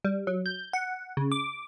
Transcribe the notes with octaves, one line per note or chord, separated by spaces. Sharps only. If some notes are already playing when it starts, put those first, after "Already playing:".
G3
F#3
G6
F#5
C#3
D6